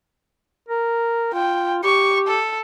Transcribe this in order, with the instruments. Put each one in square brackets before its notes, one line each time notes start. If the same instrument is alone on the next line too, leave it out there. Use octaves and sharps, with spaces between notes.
[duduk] A#4
[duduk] F4 [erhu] G5
[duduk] G4 [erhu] C#6
[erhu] A4